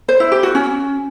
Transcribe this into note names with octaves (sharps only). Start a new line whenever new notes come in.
C5
E4
G4
F#4
C#4